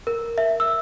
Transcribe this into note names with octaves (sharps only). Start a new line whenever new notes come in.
A#4
E5
E6